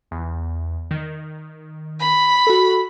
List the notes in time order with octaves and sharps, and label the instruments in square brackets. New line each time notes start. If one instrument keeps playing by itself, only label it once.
[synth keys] E2
D#3
[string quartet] B5
[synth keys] F#4 A4